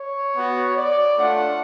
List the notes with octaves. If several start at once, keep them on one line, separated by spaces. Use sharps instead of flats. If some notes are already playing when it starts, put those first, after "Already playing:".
Already playing: C#5
B3 F#4
D5
A3 D4 F4 F#5